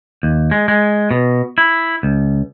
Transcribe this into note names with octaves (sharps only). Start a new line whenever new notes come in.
D#2
G#3
G#3
B2
E4
C#2